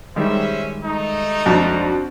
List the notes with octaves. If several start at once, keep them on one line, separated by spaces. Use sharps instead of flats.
D#3 G3 G#3 C#4 C5 E5
A3 D#4
F2 C4 D4 F#4